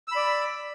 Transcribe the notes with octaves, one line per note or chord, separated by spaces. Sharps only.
D5 B5 E6